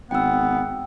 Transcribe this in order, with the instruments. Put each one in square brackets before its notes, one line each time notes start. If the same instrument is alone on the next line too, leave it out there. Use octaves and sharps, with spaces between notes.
[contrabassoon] G#1 [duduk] B3 [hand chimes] G5 E6